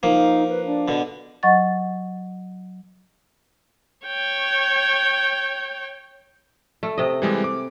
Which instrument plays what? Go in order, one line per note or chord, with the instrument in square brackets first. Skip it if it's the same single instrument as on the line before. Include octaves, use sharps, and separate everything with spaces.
[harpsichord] F3 A#3 [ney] D#4
[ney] B4
D4
[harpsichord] B2 D3
[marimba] F#3 D#5 F#5 C#6 A6
[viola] C#5 G5
[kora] A3
C3 D#5
[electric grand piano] E3 G3 G#3
D6